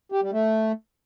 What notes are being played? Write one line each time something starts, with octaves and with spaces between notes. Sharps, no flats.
G4
G3
A3